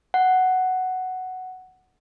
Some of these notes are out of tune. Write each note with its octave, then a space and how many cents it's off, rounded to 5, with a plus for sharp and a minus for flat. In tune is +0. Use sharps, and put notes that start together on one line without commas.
F#5 +5